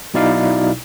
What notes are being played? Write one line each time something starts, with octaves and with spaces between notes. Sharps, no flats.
B1 B2 D#4 E4 D5 F5